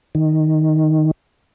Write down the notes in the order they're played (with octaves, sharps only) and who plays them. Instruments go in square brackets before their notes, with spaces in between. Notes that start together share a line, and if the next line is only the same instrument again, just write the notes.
[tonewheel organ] D#3